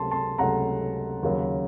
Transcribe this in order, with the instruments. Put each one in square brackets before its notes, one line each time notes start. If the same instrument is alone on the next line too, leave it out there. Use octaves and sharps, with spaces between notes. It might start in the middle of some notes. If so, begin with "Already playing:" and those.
Already playing: [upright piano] C#2 C3 F#3 A3 A5 C6
A5 C6
C#2 C3 F#3 A3 F#5 A#5
D#2 C#3 F#3